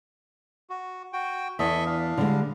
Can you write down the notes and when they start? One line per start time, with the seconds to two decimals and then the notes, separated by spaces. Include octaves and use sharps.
0.70 F#4
1.13 F#4 G5
1.59 E2 A4 D#5 E5
1.86 D4 F5
2.17 D3 G3 G#3